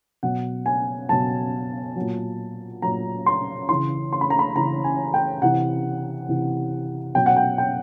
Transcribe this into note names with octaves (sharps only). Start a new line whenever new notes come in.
B2 F#3 F#5
G#5
B2 F#3 A5
F#3
A#2
A#2 F#3 A#5
C6
C#3 E3 C6
C6
B5
A#5
B5
C#3 E3 A#5
G#5
G5
C3 E3 F#5
C3 E3
B2 F#3 G5
F#5
G5
G5